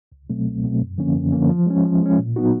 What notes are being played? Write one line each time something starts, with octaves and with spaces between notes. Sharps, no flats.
C#2
B2 F#3 A3 C4
C#2
B2 F#3 A3 C4
F#2
D3 F3 A#3 C#4
F#2
D3 F3 A#3 C#4
F3
G#3 C#4
F3
G#3 C#4
A#2
F#3 B3 D#4 F#4